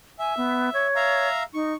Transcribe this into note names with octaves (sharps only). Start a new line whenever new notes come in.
E5 G#5
B3
C#5
E5 F5 A#5
D#4 C#6